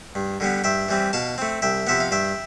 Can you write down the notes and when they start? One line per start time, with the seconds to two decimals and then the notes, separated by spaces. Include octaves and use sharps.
0.15 G2
0.40 D3 G3 B3
0.64 G2 E5 G5
0.88 E3 G3 C4
1.13 B2 F5 A5
1.38 A3 C4
1.62 C2 E5 G5
1.87 C3 F3 B3 E5
2.00 F5
2.11 G2 E5 G5